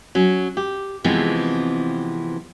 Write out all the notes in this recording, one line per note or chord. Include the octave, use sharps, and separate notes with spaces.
F#3 C#4
G4
C3 E3 F3 G#3 B3 C4